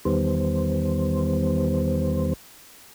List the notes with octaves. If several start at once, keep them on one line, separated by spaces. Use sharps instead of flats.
E2 D#3 G3 B3 C5